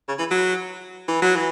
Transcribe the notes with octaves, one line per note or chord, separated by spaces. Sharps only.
C#3
E3
F#3
E3
F#3
E3